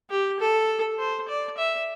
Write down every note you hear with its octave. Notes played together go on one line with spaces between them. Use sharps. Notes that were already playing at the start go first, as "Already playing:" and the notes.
G4
A4
C5
D5
E5